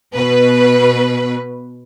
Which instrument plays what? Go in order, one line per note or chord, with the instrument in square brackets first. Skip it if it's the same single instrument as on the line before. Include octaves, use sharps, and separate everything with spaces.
[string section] B2 B4